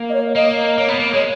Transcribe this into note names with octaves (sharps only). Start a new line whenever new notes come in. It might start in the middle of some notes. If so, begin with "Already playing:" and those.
Already playing: A#3
D#5
C#5
A#3 D#5
A#3 C#5
B3
A#3
G#3 C#5